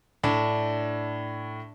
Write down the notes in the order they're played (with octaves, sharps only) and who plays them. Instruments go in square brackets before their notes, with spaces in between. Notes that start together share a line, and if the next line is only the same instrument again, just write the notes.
[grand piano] A2 [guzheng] D4